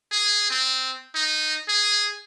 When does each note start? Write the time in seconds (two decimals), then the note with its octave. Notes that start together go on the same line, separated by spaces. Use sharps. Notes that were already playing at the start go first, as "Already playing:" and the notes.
0.12 G#4
0.50 C4
1.15 D#4
1.69 G#4